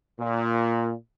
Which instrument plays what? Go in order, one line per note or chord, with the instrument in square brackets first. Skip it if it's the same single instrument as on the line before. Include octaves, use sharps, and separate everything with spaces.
[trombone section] A#2